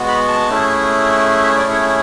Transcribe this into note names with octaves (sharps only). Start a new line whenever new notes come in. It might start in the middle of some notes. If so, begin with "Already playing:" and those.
Already playing: G#3 B3 F#4
B5
A5
A3 C#4 E4 G#4
E5
D5
C#5